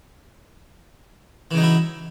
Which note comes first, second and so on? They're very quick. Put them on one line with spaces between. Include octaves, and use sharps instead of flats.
E3 C#3 D#4 F#3 E4